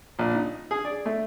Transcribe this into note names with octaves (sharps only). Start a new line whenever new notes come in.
A#1
D#4
G#4
D5
A3